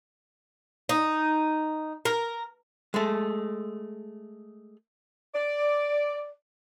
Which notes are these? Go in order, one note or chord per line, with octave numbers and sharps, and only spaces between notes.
D#4
A#4
G#3 A3
D5